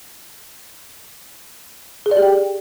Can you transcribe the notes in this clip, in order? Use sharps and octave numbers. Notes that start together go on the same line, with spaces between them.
G#4
D5
G4
G5